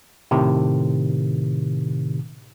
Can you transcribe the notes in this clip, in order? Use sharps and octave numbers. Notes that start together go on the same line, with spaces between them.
A2 C3 D#3